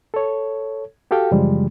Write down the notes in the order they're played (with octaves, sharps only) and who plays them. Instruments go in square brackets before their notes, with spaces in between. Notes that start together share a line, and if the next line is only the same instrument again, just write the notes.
[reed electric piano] A4 C#5
F#4 G4 A4 F5 G5
F#2 C#3 E3 F3 G3 G#3